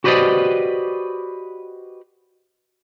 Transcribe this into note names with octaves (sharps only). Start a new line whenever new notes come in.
F#4 G4 B4 C5 D5 D#5